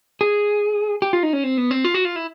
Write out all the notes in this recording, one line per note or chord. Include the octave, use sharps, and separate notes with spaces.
G#4
G4
F4
D#4
C#4
C4
B3
C4
F4
F#4
F4
E4